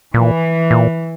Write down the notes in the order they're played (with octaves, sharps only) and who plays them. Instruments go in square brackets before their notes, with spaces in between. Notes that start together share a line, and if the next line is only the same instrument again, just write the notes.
[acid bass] A#2 [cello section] E3
[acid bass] A#2